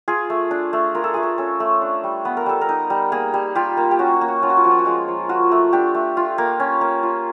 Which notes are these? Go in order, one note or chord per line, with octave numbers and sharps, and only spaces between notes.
F4 G#4
A3
D4
A3
F4 A#4
A4
A3 G#4
A4
C#4 A4
A3
D4
G3
B3 B4
A#4
G3 A4
A#4
D#4
G3
A#3 G#4
G3
F4 G4
A#3
G4
C#4 F#4
F#4
A#3
F#4
C#4 F4
F#4
F4
F3 F#4
F4
F#4
G#3 F4
F3
F4 F#4
A3
D4 G4
A3
F4
A#3
C#4
A#3
F4